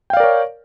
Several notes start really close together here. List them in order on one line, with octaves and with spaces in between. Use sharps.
G5 F5 D5 A#4 C#5